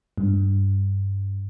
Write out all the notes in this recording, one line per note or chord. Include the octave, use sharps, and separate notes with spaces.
G2